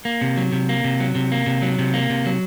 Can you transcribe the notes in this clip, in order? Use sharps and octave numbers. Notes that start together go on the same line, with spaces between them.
A#3
C3
F#3
C3
A#3
C3
F#3
C3
A#3
C3
F#3
C3
A#3
C3
F#3